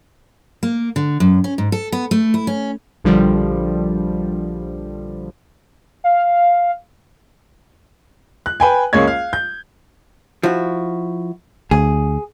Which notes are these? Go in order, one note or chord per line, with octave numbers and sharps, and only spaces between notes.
A#3
D3
F#2
C#4
G#2
A4
B3
A3
E4
C#4
A#1 D3 F3 G3
F5
F#6
B4 G5 G#5
C#2 G#3 A#3 C#4 C#5 G#6
F5
G6
F3 E4 F#4
D2 G#4